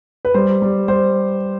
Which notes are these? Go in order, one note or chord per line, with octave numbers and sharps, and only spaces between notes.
B4
G3 C5
G3
G3 C5